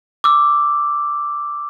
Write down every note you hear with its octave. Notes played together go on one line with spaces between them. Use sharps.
D6 E6